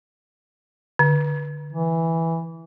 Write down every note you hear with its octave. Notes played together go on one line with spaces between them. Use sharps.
D3
E3